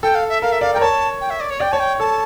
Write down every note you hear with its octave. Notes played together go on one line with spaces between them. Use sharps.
A4 G5
F5
E5
A#4 F5
E5
D5 F5
G5
A#4
C#5 A5
G5
E5
D5
C#5
D5 G5
C#5 A5
G5
A4 A5